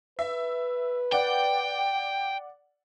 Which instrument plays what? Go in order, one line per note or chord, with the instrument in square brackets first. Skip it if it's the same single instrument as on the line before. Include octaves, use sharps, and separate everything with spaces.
[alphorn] B4 [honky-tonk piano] E5
[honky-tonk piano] D5 F#5 [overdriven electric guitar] G5